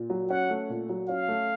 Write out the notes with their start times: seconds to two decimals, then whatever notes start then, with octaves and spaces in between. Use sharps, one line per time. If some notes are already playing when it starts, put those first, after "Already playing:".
Already playing: A#2
0.10 F#3
0.29 C#4 F#5
0.50 A3
0.69 A#2
0.89 F#3
1.08 C#4 F5
1.28 A3